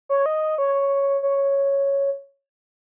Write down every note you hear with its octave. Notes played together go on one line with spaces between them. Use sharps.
C#5
D#5
C#5
C#5